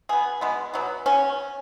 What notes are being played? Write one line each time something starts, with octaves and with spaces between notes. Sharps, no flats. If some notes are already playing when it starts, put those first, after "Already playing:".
B2 B3 G#4
B2 G#3 B3
B2 F#3 B3
B2 C#4